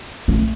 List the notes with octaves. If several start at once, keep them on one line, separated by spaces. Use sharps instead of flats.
A3